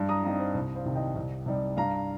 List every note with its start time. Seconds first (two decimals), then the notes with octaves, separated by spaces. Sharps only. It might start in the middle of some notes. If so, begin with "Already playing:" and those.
Already playing: G2
0.09 A#5 D#6
0.24 G3 C4 D#4 F5 A#5
0.39 C5 F5
0.54 C2 C5
0.75 C5 F5
0.85 C3 D#3
0.95 D#5 G5
1.15 C2
1.46 C3 G3 D#4
1.77 G2 F5 A#5